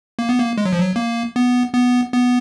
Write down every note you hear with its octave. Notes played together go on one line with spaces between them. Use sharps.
A#3
B3
A#3
G#3
F#3
F3
F#3
A#3
B3
B3
B3